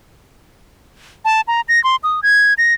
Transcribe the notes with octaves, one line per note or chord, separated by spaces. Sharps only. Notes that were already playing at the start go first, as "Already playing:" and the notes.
A5
A#5
A#6
C6
D#6
G#6
A#6